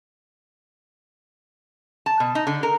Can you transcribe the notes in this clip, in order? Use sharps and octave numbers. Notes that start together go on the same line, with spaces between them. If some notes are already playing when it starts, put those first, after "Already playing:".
A5
B2
D#4
D3
A#4